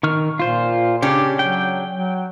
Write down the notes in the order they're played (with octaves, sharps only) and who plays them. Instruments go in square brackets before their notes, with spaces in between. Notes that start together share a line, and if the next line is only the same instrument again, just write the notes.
[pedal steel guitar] D#3 C#6 F6
[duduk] A#2 [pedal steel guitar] F4 C5
[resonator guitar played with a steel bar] C#3 C#4 D4 [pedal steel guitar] G4
[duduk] F#3 [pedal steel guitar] G5
[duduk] F#3